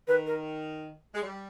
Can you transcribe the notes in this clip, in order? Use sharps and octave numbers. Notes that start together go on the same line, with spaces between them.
D#3 B4
A#4
G#3
G3